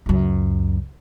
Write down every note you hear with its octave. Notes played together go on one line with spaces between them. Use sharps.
C#2 F#2